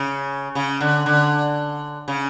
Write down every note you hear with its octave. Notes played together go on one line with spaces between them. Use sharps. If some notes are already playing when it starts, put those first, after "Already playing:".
Already playing: C#3
C#3
D3
D3
C#3